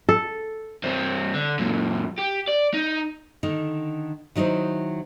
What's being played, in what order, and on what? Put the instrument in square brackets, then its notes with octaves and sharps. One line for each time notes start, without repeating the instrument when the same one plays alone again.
[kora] A4
[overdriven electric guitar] G2 C4
D3
F#2 A#2
G4
D5
D#4
[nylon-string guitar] D3 D#3 D#4
D#3 F#3 D#4 E4 C5